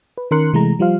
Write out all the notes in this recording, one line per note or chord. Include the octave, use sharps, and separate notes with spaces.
B4
D#3 C#4 A#4 C6 F#6 C#7
C3 E3 G#3 A3 A#5
F3 G3 F4 C5 F5